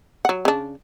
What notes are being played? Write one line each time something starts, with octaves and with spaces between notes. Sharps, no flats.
F#3 F#5
C#3 D4